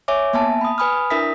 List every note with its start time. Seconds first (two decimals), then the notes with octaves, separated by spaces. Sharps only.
0.08 C#5 E5 G#5 D6
0.33 A#3 B3 E5 G#5 A5
0.61 B5 D#6
0.78 B4 G#5 B5 D#6 F6
1.10 D4 E4 A#4 E5 D#6 B6